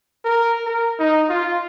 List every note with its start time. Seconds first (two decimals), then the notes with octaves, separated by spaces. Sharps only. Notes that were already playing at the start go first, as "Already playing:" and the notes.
0.25 A#4
0.66 A#4
1.00 D#4
1.30 F4